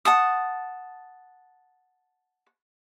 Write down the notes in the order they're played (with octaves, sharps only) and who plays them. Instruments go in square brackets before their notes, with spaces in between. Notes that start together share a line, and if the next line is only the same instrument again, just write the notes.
[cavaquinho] F#5 A5 D#6